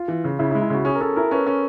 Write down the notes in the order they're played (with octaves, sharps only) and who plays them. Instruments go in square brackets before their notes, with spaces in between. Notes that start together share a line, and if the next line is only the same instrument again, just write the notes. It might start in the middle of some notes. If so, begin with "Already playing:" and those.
Already playing: [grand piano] F4
[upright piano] E3
C#3
[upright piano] C#3 [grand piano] E4
[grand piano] E4
[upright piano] G#3
[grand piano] E4
[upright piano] C#3 [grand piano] F#4
[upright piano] C#4 [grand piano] G#4
[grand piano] A#4
[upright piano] C#4 [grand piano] A4
[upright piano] E4 [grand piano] A#4
[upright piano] C#4 [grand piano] B4
[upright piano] C#4